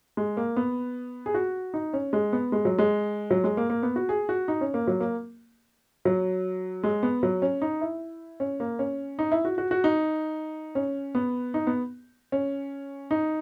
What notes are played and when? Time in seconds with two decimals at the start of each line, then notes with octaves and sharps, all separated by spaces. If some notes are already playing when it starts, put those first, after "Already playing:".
0.17 G#3
0.37 A#3
0.56 B3
1.26 G#4
1.34 F#4
1.74 D#4
1.93 C#4
2.13 G#3
2.33 B3
2.52 G#3
2.65 F#3
2.78 G#3
3.31 F#3
3.44 G#3
3.57 A#3
3.70 A#3
3.83 B3
3.96 F#4
4.09 G#4
4.29 F#4
4.48 D#4
4.61 C#4
4.74 A#3
4.87 F#3
5.00 A#3
6.05 F#3
6.83 G#3
7.03 B3
7.23 F#3
7.42 C#4
7.62 D#4
7.81 E4
8.40 C#4
8.60 A#3
8.79 C#4
9.19 D#4
9.32 E4
9.45 F#4
9.58 F#4
9.71 F#4
9.84 D#4
10.75 C#4
11.15 B3
11.54 D#4
11.67 B3
12.32 C#4
13.11 D#4